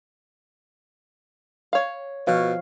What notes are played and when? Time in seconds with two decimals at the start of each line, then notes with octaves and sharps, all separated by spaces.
1.73 C#5 F5
2.27 B2 F3 C#5 F5